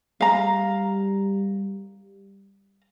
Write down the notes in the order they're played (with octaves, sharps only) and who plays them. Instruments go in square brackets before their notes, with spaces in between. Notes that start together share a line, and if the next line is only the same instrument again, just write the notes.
[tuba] G3 [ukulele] F5 A#5